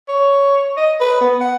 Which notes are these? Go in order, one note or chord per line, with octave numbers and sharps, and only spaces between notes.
C#5
D#5
B4
B3
F#5